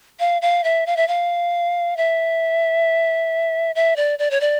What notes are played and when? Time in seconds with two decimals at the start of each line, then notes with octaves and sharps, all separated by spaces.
0.20 F5
0.42 F5
0.64 E5
0.86 F5
0.97 E5
1.08 F5
1.97 E5
3.75 E5
3.96 D5
4.19 D5
4.31 C#5
4.41 D5